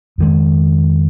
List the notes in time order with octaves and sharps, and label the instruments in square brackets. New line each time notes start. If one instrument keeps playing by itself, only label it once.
[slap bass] F2 D#3 G#3